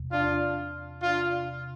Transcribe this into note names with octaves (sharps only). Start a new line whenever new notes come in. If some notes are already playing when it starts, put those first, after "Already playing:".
Already playing: E2 C3
D4 F4
D4 F4